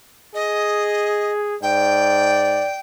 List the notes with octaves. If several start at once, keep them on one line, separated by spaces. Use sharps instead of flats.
G#4 D#5
G#2 D5 G5